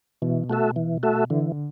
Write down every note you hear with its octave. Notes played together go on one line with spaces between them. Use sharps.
B2 E3
A3 F#4 A4 E5
E3
A3 F#4 A4 E5
D3 E3